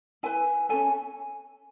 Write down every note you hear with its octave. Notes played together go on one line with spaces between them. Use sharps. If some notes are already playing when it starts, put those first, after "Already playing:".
E4 B4 G#5
C#4 F#4 A4 G#5